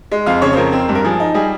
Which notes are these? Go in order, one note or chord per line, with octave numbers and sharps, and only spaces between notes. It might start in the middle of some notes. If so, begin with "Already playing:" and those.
G#3
F2 F5
C#3 C#5
C5
F2 A#4
C4
G2
A#4
F3 G#4
D#4
G3 G#4